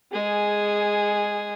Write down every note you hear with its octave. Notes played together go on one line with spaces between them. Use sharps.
G#3 G#4